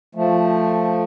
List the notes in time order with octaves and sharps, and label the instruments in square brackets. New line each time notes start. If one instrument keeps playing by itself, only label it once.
[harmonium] F3 A3